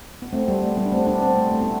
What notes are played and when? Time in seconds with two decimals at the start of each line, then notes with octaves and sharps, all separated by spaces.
0.22 B3
0.33 A3 C4
0.48 G3 B3
0.62 A3
0.77 G3 B3
0.86 D4
0.92 A3 C4
1.07 B3 D4
1.22 A3 C4
1.37 A3
1.51 A3
1.62 B3